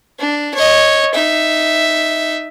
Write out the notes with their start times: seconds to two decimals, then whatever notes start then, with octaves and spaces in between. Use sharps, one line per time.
0.19 D4
0.54 C#5 D#5
1.14 D#4 E5